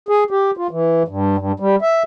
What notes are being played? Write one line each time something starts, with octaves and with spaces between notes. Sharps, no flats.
G#4
G4
F4
E3
G2
G2
G3
E5